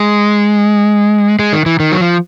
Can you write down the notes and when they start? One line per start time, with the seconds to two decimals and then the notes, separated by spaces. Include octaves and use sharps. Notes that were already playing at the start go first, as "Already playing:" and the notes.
Already playing: G#3
1.39 G#3
1.53 D#3
1.66 E3
1.80 D#3
1.92 F#3
2.00 F3